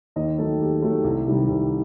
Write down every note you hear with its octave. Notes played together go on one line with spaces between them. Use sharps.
D#2 D#4 D#5
D#3 F#3 A3 A4
D#2 G4
D#3 F#3 A3
C2
C3 D#3 G3
C2